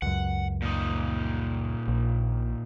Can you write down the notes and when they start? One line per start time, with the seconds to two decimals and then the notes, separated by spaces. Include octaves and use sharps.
0.02 C#2 F#2 F#5
0.62 A#2 D#4
1.88 A#1